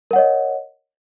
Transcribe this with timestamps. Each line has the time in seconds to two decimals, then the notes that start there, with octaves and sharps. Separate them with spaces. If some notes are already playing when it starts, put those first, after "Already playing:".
0.11 A#4
0.13 F#5
0.16 C#5
0.18 D#5